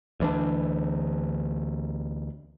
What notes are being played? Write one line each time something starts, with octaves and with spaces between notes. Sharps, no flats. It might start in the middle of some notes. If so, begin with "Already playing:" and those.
D2 E3 D4